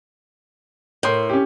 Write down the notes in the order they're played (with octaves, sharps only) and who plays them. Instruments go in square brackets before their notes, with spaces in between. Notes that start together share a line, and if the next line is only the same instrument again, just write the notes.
[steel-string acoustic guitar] A2 [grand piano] A#4 C6 G6
[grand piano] C#4 G4